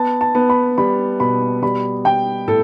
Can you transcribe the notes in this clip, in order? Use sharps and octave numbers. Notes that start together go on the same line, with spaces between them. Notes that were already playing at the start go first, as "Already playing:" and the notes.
Already playing: B3 A5
A5
B3
B5
G3 B5
B2 B5
G3 B5
G3 G5
A2 A4